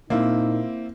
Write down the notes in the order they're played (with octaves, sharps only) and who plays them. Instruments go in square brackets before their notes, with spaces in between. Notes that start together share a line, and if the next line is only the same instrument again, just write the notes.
[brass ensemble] A#2 D#4 [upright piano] A#3 C4 E4